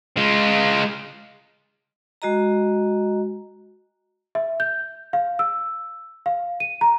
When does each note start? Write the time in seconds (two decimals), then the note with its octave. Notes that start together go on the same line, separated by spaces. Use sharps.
0.17 G#3 F4
2.22 G#3 F#4 D#5 A#5
4.35 E5
4.60 G6
5.13 F5
5.39 E6
6.26 F5
6.60 D#7
6.81 A#5